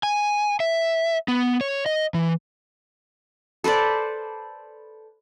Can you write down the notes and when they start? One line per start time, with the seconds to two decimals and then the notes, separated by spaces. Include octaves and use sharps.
0.03 G#5
0.60 E5
1.28 B3
1.61 C#5
1.86 D#5
2.14 E3
3.64 A4 B4 C5 D5